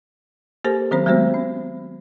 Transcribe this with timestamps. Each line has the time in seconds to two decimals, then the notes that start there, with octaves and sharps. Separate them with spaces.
0.64 A#3 G4 A4 A#4 C5
0.91 D#3 F#3 C4 C#4 C5
1.06 F#3 G#3 A3 B3 F#4 C5
1.34 C#4